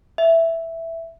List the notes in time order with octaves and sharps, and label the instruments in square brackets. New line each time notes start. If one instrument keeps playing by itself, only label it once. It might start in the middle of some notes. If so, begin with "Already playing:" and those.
[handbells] E5